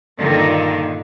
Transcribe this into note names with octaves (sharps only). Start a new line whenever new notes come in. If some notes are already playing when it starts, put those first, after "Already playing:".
G2 A#2 D3 D#3